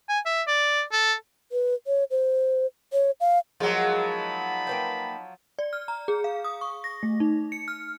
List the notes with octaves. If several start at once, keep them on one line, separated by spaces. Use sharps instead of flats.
G#5
E5
D5
A4
B4
C#5
C5
C#5
F5
F3 F#3 G#3 A#3
D#4 A5 B5
A#3 B4 G5
D5
F6
A#5
G#4
F5
D#6
C#6
A#6
A3
D#4
C#7
F6